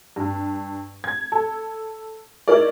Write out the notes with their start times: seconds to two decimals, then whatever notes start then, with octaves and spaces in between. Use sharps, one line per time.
0.16 G2
1.04 G#6
1.32 A4
2.48 D#4 E4 A#4 C#5 D5